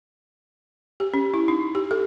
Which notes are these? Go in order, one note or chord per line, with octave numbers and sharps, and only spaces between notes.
G4
C#4
E4
D#4
G4
A4